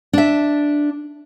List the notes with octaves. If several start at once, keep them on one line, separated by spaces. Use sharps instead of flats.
D4 E5